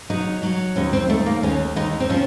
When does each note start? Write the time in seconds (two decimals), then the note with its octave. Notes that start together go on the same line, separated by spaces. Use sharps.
0.10 F#3 D#4
0.43 F#3
0.76 D#2 C#4
0.93 C4
1.09 D#2 A3
1.26 A#3
1.43 D#2 C#4
1.76 D#2 D#4
2.00 C4
2.09 F3 C#4